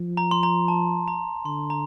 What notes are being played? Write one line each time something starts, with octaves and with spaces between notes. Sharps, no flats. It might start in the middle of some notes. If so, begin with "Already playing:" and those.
Already playing: F3
A#5
C6
A#5
A5
A#5
D3 C6
A#5